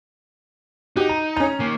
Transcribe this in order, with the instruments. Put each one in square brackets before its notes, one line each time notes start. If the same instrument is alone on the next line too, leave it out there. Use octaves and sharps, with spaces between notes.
[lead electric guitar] D#4 [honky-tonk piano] F#4 G4
[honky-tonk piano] A#5
C#4 A#5
[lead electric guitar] D#3 A#3